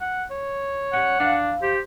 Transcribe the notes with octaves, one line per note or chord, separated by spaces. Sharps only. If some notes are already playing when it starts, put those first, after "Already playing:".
F#5
C#5
G3 C#4 F#5
F2 E3 D4 F5
G4 C5